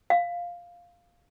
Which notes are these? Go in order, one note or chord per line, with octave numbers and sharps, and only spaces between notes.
F5